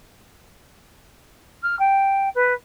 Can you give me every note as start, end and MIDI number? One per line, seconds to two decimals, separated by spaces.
1.62 1.77 89
1.79 2.29 79
2.34 2.53 71